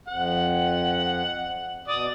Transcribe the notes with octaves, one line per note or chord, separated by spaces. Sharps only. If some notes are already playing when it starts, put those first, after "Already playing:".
F2 F#5
B2 D5 D#6